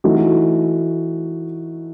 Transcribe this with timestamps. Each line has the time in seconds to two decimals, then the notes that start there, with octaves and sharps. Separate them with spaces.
0.04 E3 A3 D#4 F#4